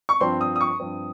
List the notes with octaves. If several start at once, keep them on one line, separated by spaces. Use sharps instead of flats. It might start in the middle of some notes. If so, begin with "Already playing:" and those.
C#6
G2 F3 C4 C6
D#6
D#6
C#6
G2 F3 C4